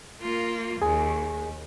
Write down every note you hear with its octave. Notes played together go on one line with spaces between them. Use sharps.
A#3 F4
D#2 G#4 G#5